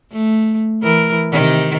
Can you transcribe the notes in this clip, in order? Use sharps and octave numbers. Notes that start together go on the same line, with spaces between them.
A3
E3 A#4
C3 D#3